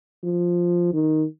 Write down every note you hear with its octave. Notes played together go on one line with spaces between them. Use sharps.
F3
D#3